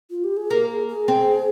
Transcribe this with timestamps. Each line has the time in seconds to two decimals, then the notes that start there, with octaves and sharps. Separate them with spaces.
0.11 F4
0.24 G4
0.37 G#4
0.50 A#3 A#4
0.69 G#4
0.88 G#4
1.08 C4